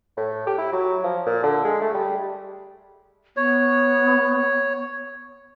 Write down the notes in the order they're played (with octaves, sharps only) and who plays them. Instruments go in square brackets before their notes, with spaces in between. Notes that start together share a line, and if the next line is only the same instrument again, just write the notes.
[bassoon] A2
G4
E4
F#3
F3
A#2
D3
G#3
A3
G3
[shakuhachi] B3 [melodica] C#5